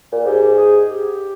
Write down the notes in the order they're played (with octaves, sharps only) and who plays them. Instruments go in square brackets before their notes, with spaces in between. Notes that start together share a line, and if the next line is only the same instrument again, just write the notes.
[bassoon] A#2
[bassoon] G#2 [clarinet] G4
[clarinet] G#4
G4